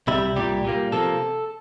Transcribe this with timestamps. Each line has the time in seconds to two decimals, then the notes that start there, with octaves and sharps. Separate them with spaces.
0.07 C2 C3 G3 E4
0.36 C2 A#2 G3 G4
0.64 A#2 G3 A#3
0.92 C3 F3 A#3 A4